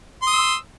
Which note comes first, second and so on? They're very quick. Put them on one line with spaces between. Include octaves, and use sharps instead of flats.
C6 D#6 E6